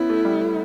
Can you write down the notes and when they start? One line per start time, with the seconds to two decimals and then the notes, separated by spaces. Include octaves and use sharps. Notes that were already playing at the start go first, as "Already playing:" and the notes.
Already playing: B3 C#4 E4
0.10 A3
0.25 G3
0.41 A3